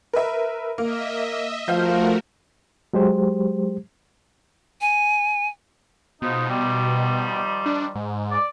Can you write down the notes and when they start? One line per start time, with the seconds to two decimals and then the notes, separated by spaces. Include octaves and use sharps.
0.13 A#4 B4 E5
0.78 A#3 D#5 E5
1.68 F3 A3 F#4 A#4 F5 G6
2.93 F#3 G#3 G4 C5
4.81 G#5
6.22 B2 F3 G#3 D#4
6.49 D#3 F3 G3
7.66 D4
7.95 G#2
8.31 D5